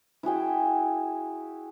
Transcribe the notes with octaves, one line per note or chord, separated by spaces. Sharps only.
E4 F#4 G#4 G5